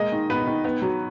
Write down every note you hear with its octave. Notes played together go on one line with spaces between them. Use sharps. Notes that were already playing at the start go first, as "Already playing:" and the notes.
Already playing: G#3 A#3 D#5
D#3
B3 B4
D#3
B3
F#3